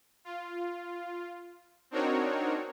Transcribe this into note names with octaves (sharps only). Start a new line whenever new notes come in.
F4
C4 D4 D#4 F#4 A#4 C#5